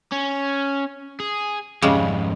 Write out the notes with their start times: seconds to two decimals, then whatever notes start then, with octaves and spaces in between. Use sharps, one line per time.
0.12 C#4
1.20 G#4
1.82 F2 G#2 C#3 G3 G#3